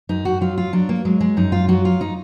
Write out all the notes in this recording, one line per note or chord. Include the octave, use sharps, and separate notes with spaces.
F#2 D#4
F#4
F#3 F4
F4
F#3 D4
A#3
F#3 G#3
G#3
F#2 D#4
F4
F#3 F#4
F4
D#4